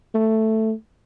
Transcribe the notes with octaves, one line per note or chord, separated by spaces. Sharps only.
A3